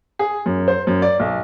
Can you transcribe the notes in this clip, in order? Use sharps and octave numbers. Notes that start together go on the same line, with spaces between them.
G#4
F#2
C5
F#2
D5
B1